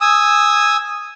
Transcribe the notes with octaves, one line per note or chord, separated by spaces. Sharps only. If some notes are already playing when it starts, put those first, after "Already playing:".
G#5 D#6 E6